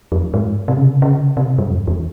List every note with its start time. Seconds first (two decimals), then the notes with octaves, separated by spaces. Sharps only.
0.12 F2
0.34 G#2
0.68 C3
0.77 C#3
0.84 C3
1.02 C#3
1.37 C3
1.58 G2
1.70 F2
1.87 E2